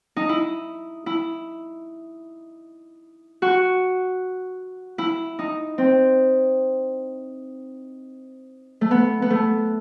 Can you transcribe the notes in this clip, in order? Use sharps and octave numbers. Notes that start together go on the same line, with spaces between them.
D#4
E4
E4
F#4
E4
D#4
C4
A3
B3
B3
A3